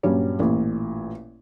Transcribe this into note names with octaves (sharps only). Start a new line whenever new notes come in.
G2 A#2 F#3 G3 C#4
A1 A#2